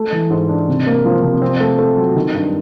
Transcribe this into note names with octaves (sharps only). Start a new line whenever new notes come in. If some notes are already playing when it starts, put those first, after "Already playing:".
Already playing: A3
E3
G#2
D4
C3
A#3
F3
C3
C4
A3
A3
F#3
D#3
G2